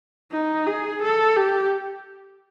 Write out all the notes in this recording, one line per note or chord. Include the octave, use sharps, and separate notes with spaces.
D#4
G#4
A4
G4